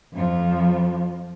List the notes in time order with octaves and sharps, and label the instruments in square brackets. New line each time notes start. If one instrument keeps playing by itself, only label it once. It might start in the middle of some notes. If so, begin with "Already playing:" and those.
[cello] F2 F3